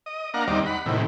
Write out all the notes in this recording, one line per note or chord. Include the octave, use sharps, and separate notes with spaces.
D#5
A#3 D4 F5 F#5 A#5
D#2 G3 C4 D#4 D5
F#5 B5
A2 C3 D#3 E3